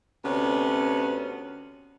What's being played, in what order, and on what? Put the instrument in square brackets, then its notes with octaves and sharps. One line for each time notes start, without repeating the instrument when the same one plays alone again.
[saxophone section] D2 C3 B3 C#4